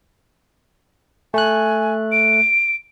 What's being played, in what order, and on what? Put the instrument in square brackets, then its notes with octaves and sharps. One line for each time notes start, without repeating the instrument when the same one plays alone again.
[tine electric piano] A3 F#6 [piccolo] G#5
[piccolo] D7